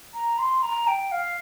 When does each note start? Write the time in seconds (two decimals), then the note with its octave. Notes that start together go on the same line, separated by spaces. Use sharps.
0.14 A#5
0.39 C6
0.63 A#5
0.87 G5
1.12 F5